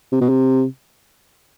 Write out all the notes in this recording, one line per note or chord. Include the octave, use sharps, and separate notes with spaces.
C3
B2
C3